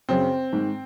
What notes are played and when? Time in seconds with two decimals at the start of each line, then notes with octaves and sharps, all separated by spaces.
0.09 F#2 C#3 C4
0.52 G#2 D#3